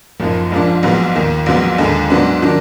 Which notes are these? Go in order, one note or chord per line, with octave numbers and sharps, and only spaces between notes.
F#1 F#2 F3 A#3 D#4
A#1 G#2 F3 A#3 D4
A#1 G#2 F#3 B3
D#2 D#3 A#3
A#1 G#2 F#3 B3
D#2 D3 G#3
G#2 F#3 B3 D4
D#3 F#3 D4